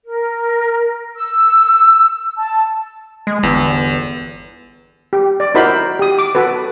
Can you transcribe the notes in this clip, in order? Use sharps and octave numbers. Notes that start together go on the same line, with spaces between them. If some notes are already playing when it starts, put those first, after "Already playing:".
A#4
E6
A5
G#3
G1 E2
G4
D5
D#4 E4 F#4 A#4 C5 B5
G4 D#6
D6
F#4 A4 B4